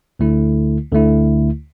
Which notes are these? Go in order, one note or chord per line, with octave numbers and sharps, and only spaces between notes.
D2 D3 A3 E4
D2 D3 A3 E4